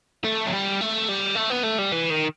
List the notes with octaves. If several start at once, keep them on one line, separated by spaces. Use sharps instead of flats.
A3
F#3
G3
A3
G3
A3
B3
A3
G3
E3
D#3